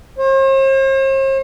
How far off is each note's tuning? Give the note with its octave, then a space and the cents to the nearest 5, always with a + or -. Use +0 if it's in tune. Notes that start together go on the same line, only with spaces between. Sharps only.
C5 +45